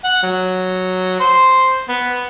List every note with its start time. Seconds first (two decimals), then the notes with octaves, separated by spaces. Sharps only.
0.05 F#5
0.23 F#3
1.20 C5
1.89 B3